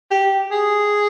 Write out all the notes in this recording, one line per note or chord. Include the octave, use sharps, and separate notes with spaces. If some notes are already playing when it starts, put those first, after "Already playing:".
G4
G#4